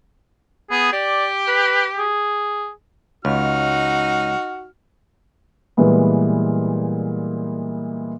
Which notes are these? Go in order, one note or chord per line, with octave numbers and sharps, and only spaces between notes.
B3 G#4
G4 D5
B4
G#4
C#2 D#4 F#4 F6
A#2 E3 G3 G#3 B3